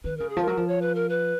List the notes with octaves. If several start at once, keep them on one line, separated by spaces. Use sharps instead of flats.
D#3 B4
C#3 A#4
G#4
F3 A#4
F#3
F3
C#5
B4
A#4
B4